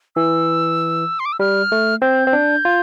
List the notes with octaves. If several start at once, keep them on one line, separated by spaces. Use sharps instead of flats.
E3 E6
C6
D6
E6
G3 F6
A3
C4 G6
C4
D4
F4